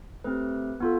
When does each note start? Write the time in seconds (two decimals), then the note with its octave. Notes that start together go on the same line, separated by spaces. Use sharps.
0.24 A3 C4 G4 B4
0.80 B3 F4 A4